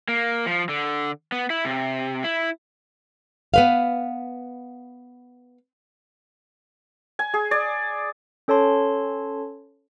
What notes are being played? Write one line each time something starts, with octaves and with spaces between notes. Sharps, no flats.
A#3
F3
D3
B3
E4
C3
E4
B3 B4 F5
G#5
G#4
D5
C#4 A4 C#5 A5 C6